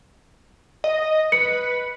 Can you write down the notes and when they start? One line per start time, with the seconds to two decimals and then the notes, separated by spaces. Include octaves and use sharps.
0.84 D#5
1.32 B4 C#7